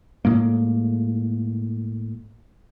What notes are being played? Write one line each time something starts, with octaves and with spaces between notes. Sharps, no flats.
A2 G#3 A#3